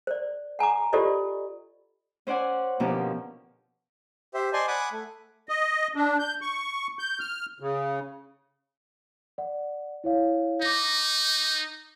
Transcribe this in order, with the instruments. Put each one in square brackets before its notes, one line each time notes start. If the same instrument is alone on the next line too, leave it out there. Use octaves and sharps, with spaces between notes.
[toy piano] C5 D5
F#5 G#5 A#5 D6
F4 G4 A4 C5 D5 D#5
[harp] C#4 C5 D5 F#5 G#5
B2 D3 F3 A#3 C#4 G4
[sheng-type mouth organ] G4 C5 E5
C5 D5 D#5 G#5 A5 C6
F#5 G#5 B5 D6 D#6
A3
[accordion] D#5
D4
G6
C#6
G6
F6
C#3
[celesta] D5 F#5
E4 C#5 F5
[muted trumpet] D#4 [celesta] D6 A#6